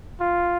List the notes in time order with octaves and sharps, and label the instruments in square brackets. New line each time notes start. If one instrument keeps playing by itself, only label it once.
[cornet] F4